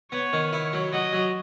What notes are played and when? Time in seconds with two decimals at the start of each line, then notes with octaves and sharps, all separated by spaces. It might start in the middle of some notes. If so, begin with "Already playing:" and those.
0.12 B3 C#5
0.33 D#3
0.53 E4
0.73 F#3
0.93 F#3 D#5
1.13 F#3